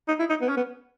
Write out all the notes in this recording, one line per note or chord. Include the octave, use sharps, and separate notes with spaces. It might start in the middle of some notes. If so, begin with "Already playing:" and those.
D#4
E4
D#4
B3
C#4
B3